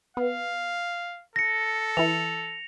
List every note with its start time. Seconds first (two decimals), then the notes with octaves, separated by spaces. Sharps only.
0.17 B3 F5
1.36 A4 A#6 C#7
1.97 E3 E4 F7